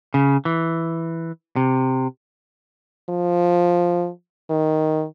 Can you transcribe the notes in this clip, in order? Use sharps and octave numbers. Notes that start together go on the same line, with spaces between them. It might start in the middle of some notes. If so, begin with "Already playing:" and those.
C#3
E3
C3
F3
D#3